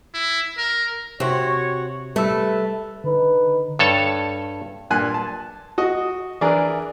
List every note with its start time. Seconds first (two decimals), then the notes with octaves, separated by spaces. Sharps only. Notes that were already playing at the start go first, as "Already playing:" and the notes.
0.14 E4
0.57 A#4
1.20 C3 F#4 G4 C5 C#5
2.16 G3 A3 B4 E6
3.04 D3 D#4 B4
3.79 G2 A4 C#5 A5
4.90 G2 A#2 G#5 F#6
5.14 A5
5.78 F#4 D#5
6.41 E3 D4 G#4 A#4